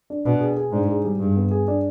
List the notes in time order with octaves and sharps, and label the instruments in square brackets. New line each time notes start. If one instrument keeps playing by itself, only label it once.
[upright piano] D4
[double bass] B2 [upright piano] D4
[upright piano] G#4
G#4
[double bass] G#2 [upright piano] D4
[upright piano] G#4
G3
[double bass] G2 [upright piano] G#4
[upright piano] B3
G#4
D4